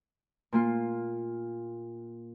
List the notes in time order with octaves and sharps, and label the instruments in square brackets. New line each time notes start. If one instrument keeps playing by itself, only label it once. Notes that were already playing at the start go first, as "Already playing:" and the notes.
[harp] A#2 A#3 F4